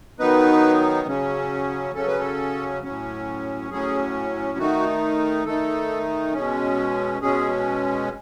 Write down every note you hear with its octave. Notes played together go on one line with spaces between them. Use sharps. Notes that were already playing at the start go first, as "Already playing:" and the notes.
D#3 F#3 B3 D#4 B4
C#3 F#3 C#4
C#3 F#3 C#4 A4
B4
A4
A2 F#3 C#4
A2 F#3 C#4 G#4
D#3 A3 D#4 F#4
D#3 A3 D#4 A4
B2 G#3 C#4
B2 G#3 C#4 G#4